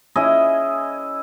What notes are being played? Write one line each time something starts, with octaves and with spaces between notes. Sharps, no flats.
C#4 E4 G#4 D#5